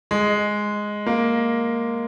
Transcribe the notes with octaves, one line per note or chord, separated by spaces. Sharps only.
G#3
A#3